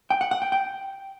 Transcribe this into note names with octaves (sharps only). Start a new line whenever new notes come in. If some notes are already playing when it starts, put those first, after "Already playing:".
G5
F#5
F#5
G5
G5